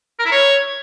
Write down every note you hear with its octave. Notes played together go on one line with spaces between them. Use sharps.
A#4
E4
C#5